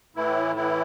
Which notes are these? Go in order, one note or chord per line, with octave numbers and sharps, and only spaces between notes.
A2 E3 E4
E3 E4